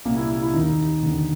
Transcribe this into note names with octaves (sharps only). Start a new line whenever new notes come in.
C2 A#2 A#3
E4
E4
E4
D#2 D#3 D#4
D#2 D3